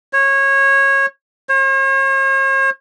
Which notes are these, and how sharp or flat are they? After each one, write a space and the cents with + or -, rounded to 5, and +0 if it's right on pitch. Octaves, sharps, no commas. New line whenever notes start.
C#5 -20
C#5 -45